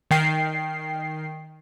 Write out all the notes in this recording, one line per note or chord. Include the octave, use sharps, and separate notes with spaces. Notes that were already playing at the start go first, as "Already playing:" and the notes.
D#3 G5 C7